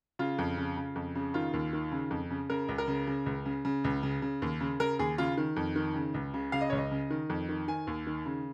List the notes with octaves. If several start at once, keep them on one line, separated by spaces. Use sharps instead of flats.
C#3 F4
F2
C#3
C#3
F2
C#3
D#3 F4
D#2
D#3
C#3
F2
C#3
C#3 A#4
C#2
A#4
C#3
C#3
C#2
C#3
C#3
C#2
C#3
C#3
D#2
C#3
C#3 A#4
D#2 G#4
C#3 F4
D#3
F2
D#3
C#3
C#2
C#3
C#3 F5
D#5
C#2 C#5
D#5
C#3
D#3
F2
D#3
D#3 G#5
D#2
D#3
C#3